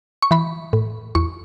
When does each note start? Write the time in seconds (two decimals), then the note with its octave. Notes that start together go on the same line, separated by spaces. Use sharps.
0.22 C#6
0.31 E3 B5
0.73 A2
1.15 E2 C#6